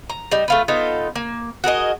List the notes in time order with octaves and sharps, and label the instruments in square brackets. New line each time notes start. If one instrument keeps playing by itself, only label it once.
[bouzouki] A#5
G3 D#4
A3 F4 B4
B3 D#4 F4 A4
A#3
F#4 G#4 A#4 D#5